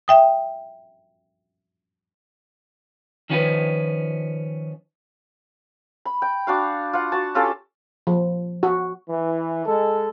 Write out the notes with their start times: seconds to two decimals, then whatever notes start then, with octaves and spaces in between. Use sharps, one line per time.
0.08 E5 G5 D#6
3.30 D#3 F3 C#4 D#4 F4 B4
6.05 B5
6.22 G5
6.47 D4 F#4 F5
6.93 F4 F#5
7.12 F#4 A5
7.35 C#4 F4 G4 A4
8.07 F3
8.63 F#4
9.09 E3
9.66 G#3 A4